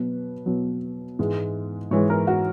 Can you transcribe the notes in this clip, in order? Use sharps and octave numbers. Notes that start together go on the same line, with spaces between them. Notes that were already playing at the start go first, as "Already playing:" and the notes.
Already playing: B2 F#3 B4
B2 F#3
G#2 E3 G#3
G#2 E3 G#3 C#5
A#4
F#4